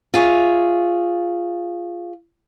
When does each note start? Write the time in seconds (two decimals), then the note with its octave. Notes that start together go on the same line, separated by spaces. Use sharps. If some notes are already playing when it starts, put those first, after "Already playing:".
0.14 F4 G#4 C#5 E5